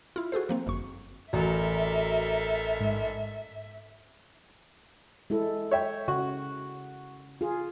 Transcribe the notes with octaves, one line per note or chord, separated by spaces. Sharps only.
E4 F4
F#4 G#4 A4 C5
F3 A#3 C4
G1 F#2 C#6
A1 F#4 A4 A#4 D5 E5 A#5
G#2
G#3 E4 A4
C#5 E5 G5
C#3 F#4
F4 G#4